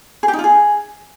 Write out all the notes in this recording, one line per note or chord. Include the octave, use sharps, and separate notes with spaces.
G#4
G4
D#4
F4
G#4